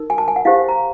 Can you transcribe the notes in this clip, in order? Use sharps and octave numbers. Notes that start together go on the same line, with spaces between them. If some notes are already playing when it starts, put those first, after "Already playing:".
Already playing: D#4 A#4
G#5
A5
G#5
F#5
E4 G4 C5 F5
A#5